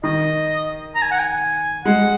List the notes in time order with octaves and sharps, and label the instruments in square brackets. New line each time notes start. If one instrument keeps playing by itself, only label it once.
[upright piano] D#3 [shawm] D#5
[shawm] A#5
G#5
F#5
G#5
[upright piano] G#3 [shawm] F#5